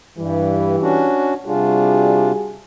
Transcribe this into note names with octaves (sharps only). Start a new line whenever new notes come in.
G2 E3 G3
C#4 D4 F#4
C3 G3 D4 F4 F#4 G#4